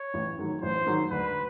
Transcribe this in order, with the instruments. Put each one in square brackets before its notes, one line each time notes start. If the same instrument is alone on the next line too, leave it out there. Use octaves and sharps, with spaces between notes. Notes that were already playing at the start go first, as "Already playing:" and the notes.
Already playing: [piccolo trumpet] C#5
[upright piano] A1
G#2 D#3 F#3
[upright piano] A1 [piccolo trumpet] C5
[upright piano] G#2 D#3 F#3
[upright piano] D2 [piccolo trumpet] B4